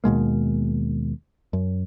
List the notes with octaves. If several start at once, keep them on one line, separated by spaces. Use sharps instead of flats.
D#2 B2 G#3 A#3
F#2